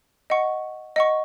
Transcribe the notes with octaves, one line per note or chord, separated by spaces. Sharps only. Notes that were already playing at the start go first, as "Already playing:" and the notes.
D#5 F#5 C#6
D#5 F#5 C#6